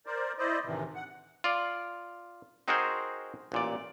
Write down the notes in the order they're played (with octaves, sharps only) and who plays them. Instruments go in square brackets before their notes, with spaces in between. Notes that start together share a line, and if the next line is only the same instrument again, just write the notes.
[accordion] A#4 C5 D5
E4 C5 D5 D#5
D2 A2 C3 D#3 E3
F#5
[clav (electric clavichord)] F4 D5
C4 D#4 F#4 G#4 A#4 C5
A1 A#2 D5